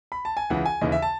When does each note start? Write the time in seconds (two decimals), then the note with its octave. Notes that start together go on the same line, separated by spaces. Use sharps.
0.12 B5
0.25 A5
0.37 G#5
0.50 C#2 C#3 E3 F#5
0.66 G#5
0.81 D#2 C#3 E3 D#5
0.92 E5
1.02 A5